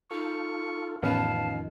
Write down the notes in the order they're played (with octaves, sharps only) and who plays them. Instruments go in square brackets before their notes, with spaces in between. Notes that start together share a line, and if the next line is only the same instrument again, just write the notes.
[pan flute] D#4 [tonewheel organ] F4 A4 [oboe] C#6
[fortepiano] A1 B3 C#4 [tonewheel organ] F2 D#3 [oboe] F5 [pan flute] A5